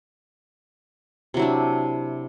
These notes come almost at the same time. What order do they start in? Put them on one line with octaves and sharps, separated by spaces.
C3 F#3 E4 D4